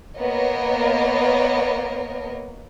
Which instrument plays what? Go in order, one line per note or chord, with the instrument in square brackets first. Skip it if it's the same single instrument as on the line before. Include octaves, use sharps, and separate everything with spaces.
[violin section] A#3 B3 A#4 C#5 D#5